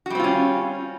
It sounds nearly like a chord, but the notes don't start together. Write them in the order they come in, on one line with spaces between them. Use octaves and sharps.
F#4 G3 C4 F4 C#4